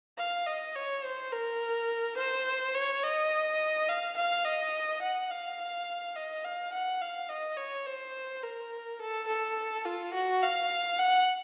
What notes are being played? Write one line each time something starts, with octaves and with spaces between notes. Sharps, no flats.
F5
D#5
C#5
C5
A#4
C5
C#5
D#5
F5
F5
D#5
F#5
F5
D#5
F5
F#5
F5
D#5
C#5
C5
A#4
A4
A4
F4
F#4
F5
F#5